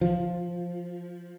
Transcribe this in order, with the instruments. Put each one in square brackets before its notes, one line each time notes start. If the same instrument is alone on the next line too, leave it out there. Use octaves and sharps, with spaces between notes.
[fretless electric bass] F3